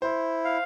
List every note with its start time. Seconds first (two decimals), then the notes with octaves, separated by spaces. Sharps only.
0.02 E4 C5
0.45 F5